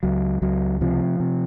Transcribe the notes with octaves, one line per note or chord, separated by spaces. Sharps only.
C#2 F#3
C#2 F#3
C3 F3
C3